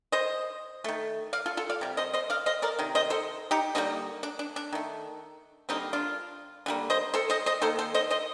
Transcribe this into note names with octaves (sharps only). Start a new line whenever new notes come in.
C5 D#5
D#3 A3
D5 F5
F4 A4
F4 A4
D5 F5
C3 G3
C5 D#5
C5 D#5
D5 F5
C5 D#5
A#4 D5
C3 D#3
C5 D#5
A4 C5
D#4 G4
D3 G3 A#3 C4 D#4
D4
D4
D4
D#3 A3
D3 G3 A#3 C4 D#4
D4 F4
D3 G3 A#3
C5 D#5
A4 C5
C5 D#5
C5 D#5
D#3 A#3 A4 C5
A4 C5
C5 D#5
C5 D#5